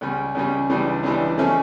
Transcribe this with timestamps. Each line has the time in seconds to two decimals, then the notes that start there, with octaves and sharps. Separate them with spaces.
0.01 C#2 C#3 G3 C#4
0.35 C#2 C#3 G3 C#4
0.70 C#2 C#3 E3 G3 D4
1.03 C#2 C#3 E3 G3 D4
1.38 C#3 F3 A3 C#4